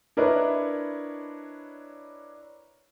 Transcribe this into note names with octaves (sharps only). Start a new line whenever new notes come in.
D4 E4 A#4 B4 C#5 D#5